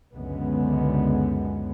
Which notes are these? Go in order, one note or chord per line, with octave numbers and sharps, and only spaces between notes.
C#2 F#2 D3 G#3 B3